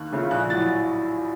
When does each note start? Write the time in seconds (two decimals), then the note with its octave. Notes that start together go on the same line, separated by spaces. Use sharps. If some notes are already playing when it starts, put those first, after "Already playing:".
Already playing: D#2 F#6
0.12 C#3 A3 C#4 F4
0.31 A#1 F#6
0.50 A2 F#3 A6